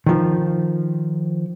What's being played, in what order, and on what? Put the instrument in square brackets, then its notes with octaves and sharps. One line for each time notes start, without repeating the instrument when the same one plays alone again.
[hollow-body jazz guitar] D#3 F3